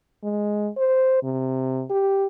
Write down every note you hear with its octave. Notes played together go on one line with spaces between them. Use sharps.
G#3
C5
C3
G4